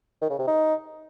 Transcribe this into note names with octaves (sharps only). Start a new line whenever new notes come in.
D#3
C#3
C3
D#4